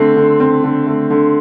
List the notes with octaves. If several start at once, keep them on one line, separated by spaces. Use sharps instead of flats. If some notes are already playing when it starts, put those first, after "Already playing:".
Already playing: D3 A3 C4
D3
C4
D3
A3
D3